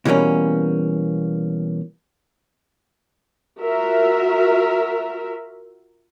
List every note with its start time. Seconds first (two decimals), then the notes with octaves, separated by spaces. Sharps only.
0.05 B2 E3 G3 A#3 C#4
3.60 F4 F#4 A#4 E5